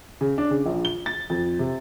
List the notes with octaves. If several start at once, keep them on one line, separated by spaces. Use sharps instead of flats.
C#3
D4
C#3
A#1
G7
A6
F2
C3